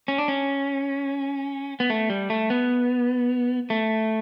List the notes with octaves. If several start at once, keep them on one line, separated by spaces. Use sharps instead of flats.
C#4
D4
C#4
B3
A3
G3
A3
B3
A3